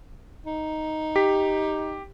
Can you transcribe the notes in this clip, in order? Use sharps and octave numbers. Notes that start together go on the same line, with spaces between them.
D#4
G4 B6